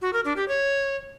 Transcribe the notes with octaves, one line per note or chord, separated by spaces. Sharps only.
F#4
A#4
D4
G4
C#5